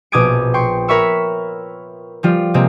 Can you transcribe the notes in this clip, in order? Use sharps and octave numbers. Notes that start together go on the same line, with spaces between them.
A#1 B2 D6 D#6 G#6 D7
G5 C6 C#6
A#4 C#5 E5 B5 C#6 E6
F3 G3 F4
C3 G#3 A#3 C4